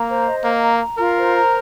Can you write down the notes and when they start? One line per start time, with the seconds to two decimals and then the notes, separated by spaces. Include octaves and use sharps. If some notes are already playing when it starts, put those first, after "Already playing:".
Already playing: A#3 A#5
0.09 C5
0.26 D#5
0.44 A#3 A#5
0.62 A#5
0.80 A#5
0.98 F4 A#4
1.16 C5
1.34 A#5